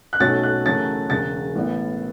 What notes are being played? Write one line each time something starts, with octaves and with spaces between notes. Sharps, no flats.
F#6
B1 B2 A3 C#4 A6
F#6
F#2 C#3 E3 A3 C#4 A6
E1 E2 C#3 A6
A1 A2 E3 B3